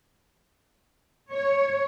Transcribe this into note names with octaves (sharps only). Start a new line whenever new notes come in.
C#5